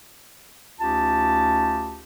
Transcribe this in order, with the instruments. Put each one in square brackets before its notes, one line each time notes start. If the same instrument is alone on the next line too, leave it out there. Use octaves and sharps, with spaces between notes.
[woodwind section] D2 C#4 D#4 F4 G4 A5